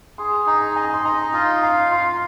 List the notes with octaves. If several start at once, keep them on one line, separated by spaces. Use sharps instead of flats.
G#4 C6
D#4 A#5
D#5 G#5
C6
D#4 A#5
F4 C6
F5 A#5
F4 C6